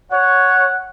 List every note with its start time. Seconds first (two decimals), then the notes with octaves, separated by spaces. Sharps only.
0.12 C#5 F#5